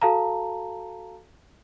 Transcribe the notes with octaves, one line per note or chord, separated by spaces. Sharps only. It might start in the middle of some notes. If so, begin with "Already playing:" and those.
F#4 A4 F5 A5 A#5